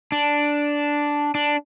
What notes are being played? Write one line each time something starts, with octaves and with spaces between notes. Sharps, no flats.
D4
D4